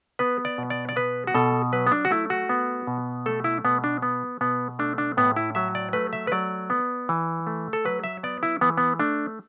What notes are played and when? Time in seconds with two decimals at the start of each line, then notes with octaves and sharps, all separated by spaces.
0.19 B3 B4
0.45 D5
0.58 B2
0.70 D5
0.89 D5
0.96 B3 B4
1.27 F#4
1.35 B2 A4
1.72 F#3 B4
1.87 B3
1.92 D4
2.05 F#4
2.11 A3 E4
2.30 F#4
2.49 B3
2.87 B2
3.26 A3 A4
3.44 E4
3.64 B2 B3
3.84 D4
4.02 B3
4.41 B2 B3
4.79 A3 D4
4.98 D4
5.17 A2 B3
5.36 E4
5.55 F#3 E5
5.75 D5
5.93 A3 B4
6.13 E5
6.27 B4
6.32 F#3 D5
6.70 B3
7.09 E3
7.47 A3
7.73 A4
7.85 F#3 B4
8.04 E5
8.23 B3 D5
8.43 E4
8.61 E3 B3
8.78 B3
8.99 A3 D4